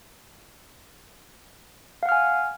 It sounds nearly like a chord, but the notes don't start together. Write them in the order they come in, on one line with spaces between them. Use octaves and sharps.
F5 F#5 F6 G#5